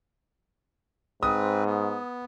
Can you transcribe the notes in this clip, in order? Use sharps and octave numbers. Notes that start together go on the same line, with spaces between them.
G#2 C4 B4 D#6
B3